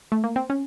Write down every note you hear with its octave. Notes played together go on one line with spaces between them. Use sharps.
A3
A#3
C4
C#4